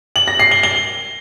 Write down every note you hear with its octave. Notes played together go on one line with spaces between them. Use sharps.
F#7
A#6
C7
G7
G7